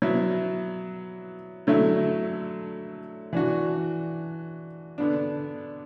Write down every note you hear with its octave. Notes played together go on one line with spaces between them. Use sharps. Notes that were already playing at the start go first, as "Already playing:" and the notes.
F#3 B3 E4
D3 F#3 A3 E4
E3 D4 F#4
D3 B3 D4